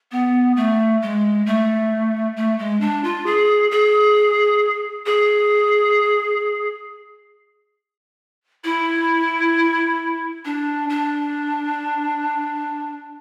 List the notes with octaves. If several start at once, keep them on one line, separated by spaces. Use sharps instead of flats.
B3
A3
G#3
A3
A3
G#3
D4
F4
G#4
G#4
G#4
E4
D4
D4